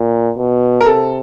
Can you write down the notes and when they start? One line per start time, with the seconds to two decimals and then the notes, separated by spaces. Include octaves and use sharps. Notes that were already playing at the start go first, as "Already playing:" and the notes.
Already playing: A#2
0.37 B2
0.81 A#4
0.85 C3 A4